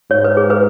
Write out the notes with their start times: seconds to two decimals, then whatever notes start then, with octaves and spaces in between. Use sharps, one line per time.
0.11 G#2 C#5
0.24 B4
0.37 G#4
0.50 B4